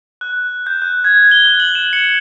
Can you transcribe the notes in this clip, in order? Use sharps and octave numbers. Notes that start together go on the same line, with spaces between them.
F#6
G6
F#6
G#6
G7
F#6
F#7
E7
C#7